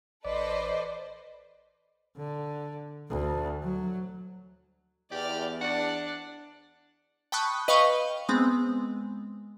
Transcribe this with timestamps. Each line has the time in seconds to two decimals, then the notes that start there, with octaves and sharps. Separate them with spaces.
0.25 A1 A4 B4 C5 D5 D#5
2.17 D3
3.09 D2
3.63 F#3
5.12 E2 G4 D5 F6
5.61 D4 D5 F#5
7.32 G5 A5 B5 C#6 D#6 F#6
7.68 B4 D#5 F5 G5 B5 C#6
8.29 G#3 B3 C4